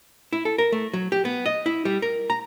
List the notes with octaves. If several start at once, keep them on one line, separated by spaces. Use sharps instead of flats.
E4
A4
A#4
A3
F#3
G4
B3
D#5
E4
G3
A#4
A#5